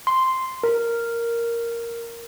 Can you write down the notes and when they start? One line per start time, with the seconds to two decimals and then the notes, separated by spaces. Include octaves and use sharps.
0.07 C6
0.63 A#4